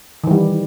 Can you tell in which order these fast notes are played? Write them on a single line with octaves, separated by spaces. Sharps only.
D#3 E3 G3